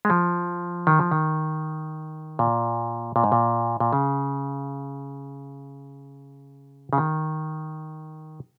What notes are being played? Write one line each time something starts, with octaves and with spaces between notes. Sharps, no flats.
G#3
F3
D#3
F3
D#3
A#2
A#2
G#2
A#2
A#2
C#3
C#3
D#3